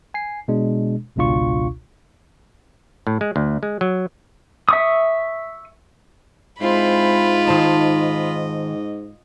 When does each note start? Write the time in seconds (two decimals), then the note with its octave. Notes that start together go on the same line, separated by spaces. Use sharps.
0.14 G#5 C7
0.48 B2 G#3 D4
1.16 G#1 C#2 B2 D4 F4 C#6
3.07 A2
3.21 G#3
3.36 D2
3.63 G#3
3.81 F#3
4.69 E5 C#6 D#6
6.61 G#2 G#3 C4 E4 F4 B5
7.47 D#3 C5 D#5 A5